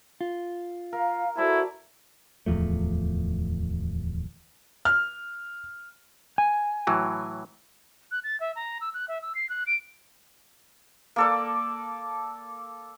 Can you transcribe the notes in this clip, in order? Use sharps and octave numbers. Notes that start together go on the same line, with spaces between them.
F4
A#4 F5
E4 F#4 A4 C5 D5 A5 A#5
D1 E2 F3 A3
F6
G#5
A2 E3 F#3
F#6
A6
E5
A#5
E6
F#6
E5
E6
C7
F#6
D7
A#3 A4 D5